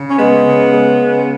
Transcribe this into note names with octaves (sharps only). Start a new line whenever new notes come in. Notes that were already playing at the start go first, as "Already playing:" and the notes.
Already playing: C#3
C#4
G#3 B3
C#3
G#3
C#3